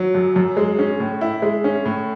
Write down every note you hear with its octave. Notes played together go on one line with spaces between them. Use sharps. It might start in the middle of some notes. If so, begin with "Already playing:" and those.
Already playing: F#3
F#2
F#2
G#3
C#4
A2
E4
G#3
C#4
A2